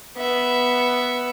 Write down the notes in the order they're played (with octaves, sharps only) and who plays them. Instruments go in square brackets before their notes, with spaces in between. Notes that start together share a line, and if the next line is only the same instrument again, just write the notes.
[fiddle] B3 E5